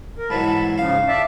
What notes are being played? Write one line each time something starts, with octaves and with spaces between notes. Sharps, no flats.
A#4
G#2 E3 F#3 A5 B5
G#2 C#3 F3 F5
D5 E5 A5